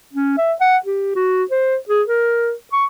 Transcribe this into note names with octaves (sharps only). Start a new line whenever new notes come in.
C#4
E5
F#5
G4
F#4
C5
G#4
A#4
C#6